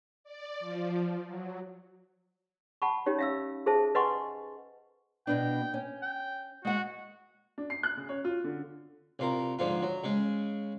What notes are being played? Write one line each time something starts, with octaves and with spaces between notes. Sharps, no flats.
D5
F3
F#3
F#5 A5 B5 C#6
C#4 D#4 G4 C#5
E5 F5 E6
G#4 A4 C5 E5 A5
B4 D#5 F#5 G#5 C6 C#6
B2 B3 D4 G5
C#4
G5
G#3 F#4 F#5
D4
C7
F#6
C#3
C#5
F4
D3
C2 F4 A#4
G#2 D3 F3 F4
F#3
C#3 G#3